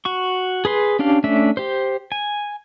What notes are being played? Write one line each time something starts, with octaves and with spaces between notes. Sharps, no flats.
F#4 C#6
G#4 B4 C6
C#4 D4 G4 F5
A3 C#4 D4 E5
G4 C5
G#5